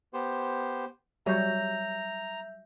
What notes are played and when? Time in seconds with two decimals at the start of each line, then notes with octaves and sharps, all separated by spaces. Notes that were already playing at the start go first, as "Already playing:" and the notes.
0.13 B3 G4 C5
1.26 F#3 G3 C#5 E5 A#5 G6